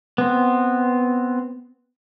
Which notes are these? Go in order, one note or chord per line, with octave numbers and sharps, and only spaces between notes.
B3 C4